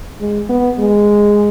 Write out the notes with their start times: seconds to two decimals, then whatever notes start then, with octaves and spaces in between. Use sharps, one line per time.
0.20 G#3
0.49 B3
0.78 G#3